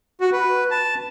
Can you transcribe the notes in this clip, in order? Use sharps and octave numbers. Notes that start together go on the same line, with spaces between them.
F#4
B4
A5